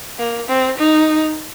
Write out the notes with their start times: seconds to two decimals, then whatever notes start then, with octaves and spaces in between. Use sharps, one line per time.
0.19 A#3
0.48 C4
0.78 D#4